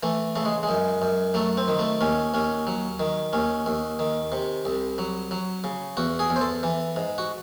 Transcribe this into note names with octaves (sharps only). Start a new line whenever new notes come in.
E3 A3
C#3 A3
G#3
G#3
F#2
F#2
F#3 A3
C4
D#3
A3
D#2 C#4
D#2 C#4
F#3
D#3
D#2 C#4
D#2
D#3
C3
C2
F#3
F#3
C#3
E2 F#4
G#4
E2
C5
A4
E3
G#2
F#4